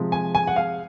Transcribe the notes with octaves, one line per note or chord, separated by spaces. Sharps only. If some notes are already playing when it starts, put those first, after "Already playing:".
Already playing: C3 F3 G#3
G#5
G#5
F#5
F5